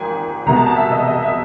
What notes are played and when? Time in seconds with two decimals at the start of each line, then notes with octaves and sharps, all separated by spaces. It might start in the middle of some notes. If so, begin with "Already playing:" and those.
Already playing: G#1 G#2 F3 A#3 G5 G#5
0.46 C2 B2 G#3 B3 A#5
0.56 A5
0.66 A5
0.76 E5
0.92 D#5
1.07 D#5
1.23 E5